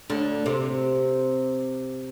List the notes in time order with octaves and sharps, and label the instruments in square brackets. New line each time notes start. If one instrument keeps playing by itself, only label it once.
[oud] D2 D3
C3